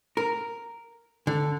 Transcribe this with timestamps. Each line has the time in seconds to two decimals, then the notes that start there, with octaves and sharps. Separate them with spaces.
0.17 A#4
1.27 D3